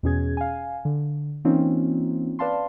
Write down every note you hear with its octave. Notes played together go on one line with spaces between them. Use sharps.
E2 B2 C#4 G#4 G#6
F5 G#5
D3
E3 A#3 C4 C#4 D#4 F4
B4 D5 F5 A5 C6